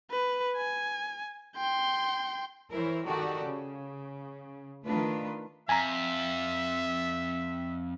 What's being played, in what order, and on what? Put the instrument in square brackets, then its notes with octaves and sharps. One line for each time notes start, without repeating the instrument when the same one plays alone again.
[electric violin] B4
G#5
G5 C6
[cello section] E3 E4 A#4 C5 C#5
D#3 F#4 G4 A4 D5
C#3
D#3 A3 D4 F4 B4
[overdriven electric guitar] F2 [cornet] E5 [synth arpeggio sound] G#5 A#5